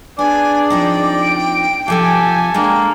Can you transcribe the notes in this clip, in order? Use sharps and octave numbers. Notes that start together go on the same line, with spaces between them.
B3 D4 G#4 D5 G#5
F3 C4 D#4 G5
D7
C3 F3 G4 A4 F5 G#5
G#3 A#3 D4 G5